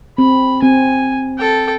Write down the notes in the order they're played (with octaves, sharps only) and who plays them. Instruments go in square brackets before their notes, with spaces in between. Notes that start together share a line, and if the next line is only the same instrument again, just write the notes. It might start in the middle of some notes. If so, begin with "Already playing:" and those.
[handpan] C4 [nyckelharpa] B5
[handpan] C4 [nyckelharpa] G#5
[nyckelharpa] A4 G5